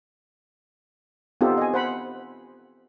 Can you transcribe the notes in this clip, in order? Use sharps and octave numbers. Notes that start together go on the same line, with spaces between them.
B3 C4 D#4 F4 G4 A4
D#5 G#5
C5 F#5 B5